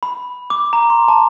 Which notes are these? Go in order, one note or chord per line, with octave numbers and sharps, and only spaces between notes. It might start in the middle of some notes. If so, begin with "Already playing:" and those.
B5
D6
A#5
C6
A5